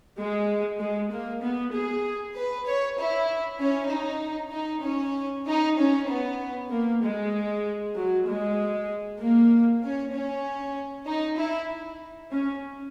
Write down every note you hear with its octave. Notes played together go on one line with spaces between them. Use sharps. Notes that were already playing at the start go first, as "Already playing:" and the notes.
G#3
G#3
A#3
B3
G#4
B4
C#5
E4
C#4
D#4
D#4
C#4
D#4
C#4
B3
A#3
G#3
F#3
G#3
A#3
C#4
C#4
D#4
E4
C#4